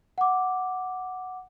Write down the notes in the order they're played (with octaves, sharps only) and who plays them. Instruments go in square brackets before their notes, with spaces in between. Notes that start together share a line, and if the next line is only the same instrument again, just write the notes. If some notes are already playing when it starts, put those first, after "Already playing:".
[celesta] F#5 D6